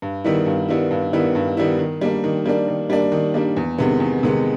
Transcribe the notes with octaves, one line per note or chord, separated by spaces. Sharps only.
G2
D#3 G3 B3 E4
G2
D#3 G3 B3 E4
G2
D#3 G3 B3 E4
G2
D#3 G3 B3 E4
D#3
G3 A#3 D4
D#3
G3 A#3 D4
D#3
G3 A#3 D4
D#3
G3 A#3 D4
E2
C3 D#3 G#3 B3
E2
C3 D#3 G#3 B3